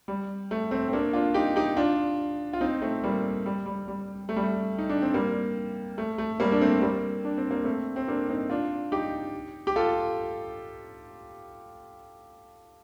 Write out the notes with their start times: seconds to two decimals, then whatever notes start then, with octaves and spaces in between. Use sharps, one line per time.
0.08 G3
0.51 A3
0.71 A3 C4
0.88 C4
0.93 A#3 D4
1.13 D4 F4
1.34 D#4 G4
1.56 D#4 G4
1.77 D4 F4
2.53 F4
2.61 C4 D#4
2.82 A3 C4
3.04 G3 A#3
3.46 G3
3.66 G3
3.88 G3
4.29 A3
4.36 G3
4.43 A3
4.78 D#4
4.89 D4
5.02 C4
5.14 G3 A#3
5.98 A3
6.18 A3
6.40 G3 A#3
6.52 D4
6.61 A3 C4
6.82 G3 A#3
7.25 D4
7.38 C4
7.51 A#3
7.64 A3 C4
7.96 C4
8.08 A#3 D4
8.29 C4 D#4
8.50 D4 F4
8.92 D#4 G4
9.67 G4
9.76 F4 A4